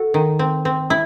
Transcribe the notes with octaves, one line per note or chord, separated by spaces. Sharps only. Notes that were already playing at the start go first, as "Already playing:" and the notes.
Already playing: F#4 A4
D#3
C4
C4
E4